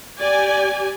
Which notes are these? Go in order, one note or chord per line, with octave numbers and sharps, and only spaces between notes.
G4 D5 G#5